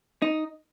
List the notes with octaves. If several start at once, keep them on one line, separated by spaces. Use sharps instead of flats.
D#4